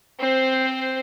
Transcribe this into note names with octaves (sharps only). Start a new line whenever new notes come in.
C4 C5